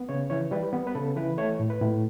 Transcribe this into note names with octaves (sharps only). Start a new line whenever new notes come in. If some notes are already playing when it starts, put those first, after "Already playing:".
Already playing: B3
C#3 C#5
E3 C#5
G3 B4
B3
B4
C#3 A4
E3 B4
A3 C#5
A2
B4
A2